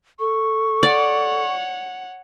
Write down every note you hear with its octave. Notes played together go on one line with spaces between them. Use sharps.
A4 C#6
C#5 D5 F#5